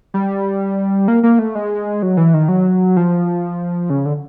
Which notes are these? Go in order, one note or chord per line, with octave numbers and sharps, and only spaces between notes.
G3
A#3
A#3
A3
G#3
F#3
E3
D#3
F#3
F3
C#3
D3